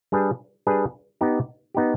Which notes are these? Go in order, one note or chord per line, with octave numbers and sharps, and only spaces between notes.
G3 D4 G#4 B4
G3 D4 G#4 B4
B3 D#4 G4
B3 D#4 G4